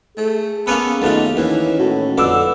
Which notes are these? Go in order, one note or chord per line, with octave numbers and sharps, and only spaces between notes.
A3 G#4
A#3 B3 C#4 A4
D#2 B2 A3 F4
D#2 E3 C#4
A2 F#4
F2 D3 B4 D6 E6